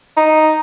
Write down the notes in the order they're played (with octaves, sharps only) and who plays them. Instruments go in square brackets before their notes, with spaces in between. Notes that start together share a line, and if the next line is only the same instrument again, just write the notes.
[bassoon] D#4